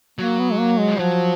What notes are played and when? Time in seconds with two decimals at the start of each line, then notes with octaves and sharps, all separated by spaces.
0.19 F#3 A#3
0.39 B3
0.52 G#3
0.59 A#3
0.79 G#3
0.88 F3
0.99 F3 F#3